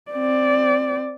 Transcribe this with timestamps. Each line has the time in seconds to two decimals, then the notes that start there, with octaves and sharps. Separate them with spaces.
0.11 C4 D5